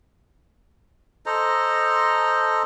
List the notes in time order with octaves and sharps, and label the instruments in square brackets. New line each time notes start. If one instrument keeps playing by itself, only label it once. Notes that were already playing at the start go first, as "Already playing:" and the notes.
[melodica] A4 C5 D#5 A#5